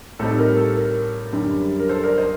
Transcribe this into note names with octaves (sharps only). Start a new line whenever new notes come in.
A2 G3 C4 D#4 A4
A#4
A4
A#4
F#2 D3 G3
A#4
A4 C5
A#4 D5
C5 D#5